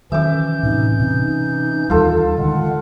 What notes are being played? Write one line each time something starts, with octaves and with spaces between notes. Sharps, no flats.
D#3 E3 F#3 C#4 E5 D6 G6
A2 C3 D#4
C3 D#4
D#2 E3 G3 F4 A4
D3 D#3 G#3 F#5